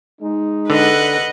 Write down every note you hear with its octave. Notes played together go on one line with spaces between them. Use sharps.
G#3 D#4
D3 B4 D#5 F#5